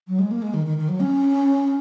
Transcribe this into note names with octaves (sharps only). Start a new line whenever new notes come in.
F#3
G#3
A#3
G#3
D#3
D#3
D#3
F#3
C#4